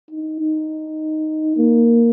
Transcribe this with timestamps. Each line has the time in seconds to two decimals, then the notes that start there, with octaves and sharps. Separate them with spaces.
0.11 D#4
0.40 D#4
1.57 A#3